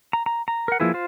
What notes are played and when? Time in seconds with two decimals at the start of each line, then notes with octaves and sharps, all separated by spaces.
0.13 A#5
0.26 A#5
0.48 A#5
0.68 A#4 F#5
0.80 F3 A#3 E4 G#4 B4
0.94 F4 C5